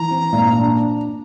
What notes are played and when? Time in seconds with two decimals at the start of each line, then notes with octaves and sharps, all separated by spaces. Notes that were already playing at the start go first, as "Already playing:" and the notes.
Already playing: E3 A#5
0.11 C4
0.33 A#2
0.53 D4